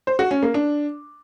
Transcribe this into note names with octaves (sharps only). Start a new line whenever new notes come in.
C5
F#4
C#4
A#3
D4